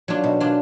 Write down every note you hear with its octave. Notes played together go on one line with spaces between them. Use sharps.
F#3 D4 F4
B2
F#3 D4 F4